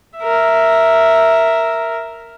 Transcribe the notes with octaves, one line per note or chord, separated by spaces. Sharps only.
A#4 E5